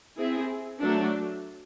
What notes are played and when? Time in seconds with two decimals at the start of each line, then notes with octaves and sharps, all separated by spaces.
0.16 C4 E4 G#4
0.81 F#3 A3 D4